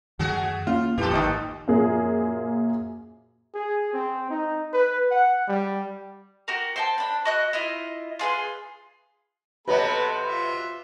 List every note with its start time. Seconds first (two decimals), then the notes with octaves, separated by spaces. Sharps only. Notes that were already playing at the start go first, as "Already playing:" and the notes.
0.19 F#2 D#3 A3 F#4 G#4
0.67 A#3 C#4 F4
0.98 F2 A#2 E3 F3 G4 A4
1.11 G#1 D#2 D#4 D#6
1.68 F#2 A#2 F3 A#3 G#4
3.55 G#4
3.93 C4
4.30 D#4
4.73 B4
5.11 F#5
5.48 G3
6.48 F#4 G4 A#4
6.76 C5 G5 A5
6.98 D4 B5
7.25 F#4 D#5 F#6
7.53 E4 F4 D#5
8.19 F4 G#4 B4 C6
9.68 C3 F#3 B3 A4 B4 D#5 B5
10.28 F4 E5